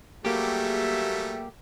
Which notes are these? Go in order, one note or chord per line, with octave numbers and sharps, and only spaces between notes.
F#3 G3 A3 A#3 G4 G#4 E5